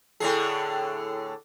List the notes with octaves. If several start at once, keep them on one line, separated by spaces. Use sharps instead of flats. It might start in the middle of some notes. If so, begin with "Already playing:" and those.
A2 D3 G#4